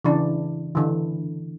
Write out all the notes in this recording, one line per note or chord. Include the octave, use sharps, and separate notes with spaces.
C#3 E3 D4
D3 E3